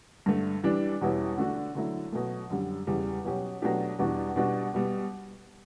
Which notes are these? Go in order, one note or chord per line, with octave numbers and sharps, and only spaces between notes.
G2 D3 A3
E3 G3 D4
E2 B2 G3 C#4 E4
D3 A3 D4 F#4
D3 F#3 A3 E4
B2 F#3 A3
F#2 D3 G3
E2 C#3 G3
B2 F#3 C#4 G4
B2 F#3 A3 D4 G4
E2 B2 G3 D4 F#4
B2 G3 D4 F#4
B2 G3 B3